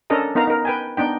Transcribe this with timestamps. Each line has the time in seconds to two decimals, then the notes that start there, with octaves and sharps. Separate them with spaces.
0.10 C#4 D4 A4 A#4 D#5 A#5
0.35 B3 D#4 A#4 F5 A#5
0.47 D#4 A#4
0.65 B4 G5 G#5
0.97 B3 D4 D#4 G5